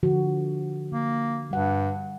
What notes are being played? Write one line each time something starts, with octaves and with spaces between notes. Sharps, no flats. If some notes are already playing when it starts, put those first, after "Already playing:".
D3 F3 F#4
D3 A#3
G2 G3 F#5